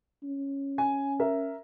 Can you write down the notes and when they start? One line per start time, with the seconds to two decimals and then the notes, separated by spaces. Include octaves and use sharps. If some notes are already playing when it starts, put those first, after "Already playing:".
0.23 C#4
0.78 G#5
1.20 A#4 E5